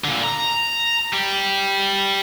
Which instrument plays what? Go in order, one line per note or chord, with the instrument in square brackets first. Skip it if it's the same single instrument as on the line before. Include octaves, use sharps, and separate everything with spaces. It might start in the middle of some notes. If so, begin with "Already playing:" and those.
[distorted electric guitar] A#2 D3
A#5
G3